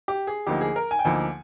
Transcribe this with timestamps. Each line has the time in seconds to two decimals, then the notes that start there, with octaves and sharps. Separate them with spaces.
0.08 G4
0.27 G#4
0.47 D2 D3 F3 A#3 D#4 G4
0.61 G#4
0.76 A#4
0.91 G#5
0.99 G5
1.05 D2 D3 F3 A#3 D#4 G#5